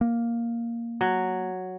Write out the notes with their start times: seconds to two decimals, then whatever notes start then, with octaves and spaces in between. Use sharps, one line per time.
0.01 A#3
1.01 F#3